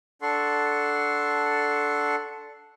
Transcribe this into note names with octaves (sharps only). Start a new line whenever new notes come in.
D4 A4 F#5 C6 C#6